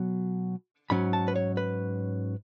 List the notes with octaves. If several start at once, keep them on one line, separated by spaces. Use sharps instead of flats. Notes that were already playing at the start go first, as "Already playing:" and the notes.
Already playing: B2 F#3
G#2 F#3 C#4 B5
A5
B4
C#5
B4